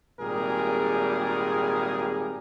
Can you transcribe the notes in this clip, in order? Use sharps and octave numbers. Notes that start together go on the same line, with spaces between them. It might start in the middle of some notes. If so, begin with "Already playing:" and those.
G#1 A#2 G3 G#4 A#4